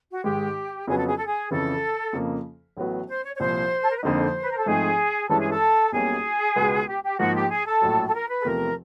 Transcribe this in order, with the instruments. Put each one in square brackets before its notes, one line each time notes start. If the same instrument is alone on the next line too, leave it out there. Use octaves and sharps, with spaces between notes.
[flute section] F#4
[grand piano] G#2 D#3 G#3 [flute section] G4
[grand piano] F2 C#3 F#3 B3 [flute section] G#4
[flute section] A4
G#4
A4
G#4
[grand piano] F2 C#3 E3 [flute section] A4
[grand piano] F2 C#3 F3 A#3
A1 A2 F#3 B3
[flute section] C5
C#5
C#5
[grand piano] C2 A#2 F3 [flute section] C5
[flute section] A4
A#4
B4
[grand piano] F2 D3 F3 A#3 D#4 [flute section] C5
[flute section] B4
A#4
A4
[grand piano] G#2 F3 A3 C4 D#4 [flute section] G#4
[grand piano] G2 E3 G#3 C#4 E4 [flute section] A4
[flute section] G#4
A4
[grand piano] B1 B2 G3 A#3 C#4 [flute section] G#4
[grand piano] C#2 B2 G#3 B3
[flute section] G4
G4
[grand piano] G#2 F3 A#3 [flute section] F#4
[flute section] G4
G#4
A4
[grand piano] A#1 A2 F#3
[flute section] A4
A#4
B4
A4
[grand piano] E2 C3 F3 A3 C4 [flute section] A#4